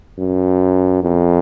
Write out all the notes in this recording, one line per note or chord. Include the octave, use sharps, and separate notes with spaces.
F#2
F2